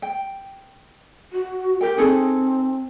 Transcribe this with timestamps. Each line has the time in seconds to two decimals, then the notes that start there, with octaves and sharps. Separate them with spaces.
0.02 G5
1.32 F#4
1.81 G4 A#4 G5
1.97 C4 D#4 G#4 A4